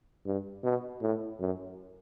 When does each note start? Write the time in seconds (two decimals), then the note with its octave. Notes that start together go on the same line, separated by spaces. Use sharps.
0.26 G2
0.64 B2
1.02 A2
1.40 F#2